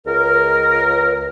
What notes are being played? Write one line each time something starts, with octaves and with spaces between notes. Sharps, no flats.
C#2 A#4